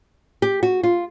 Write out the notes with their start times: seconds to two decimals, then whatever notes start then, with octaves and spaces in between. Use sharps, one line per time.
0.42 G4
0.63 F#4
0.83 F4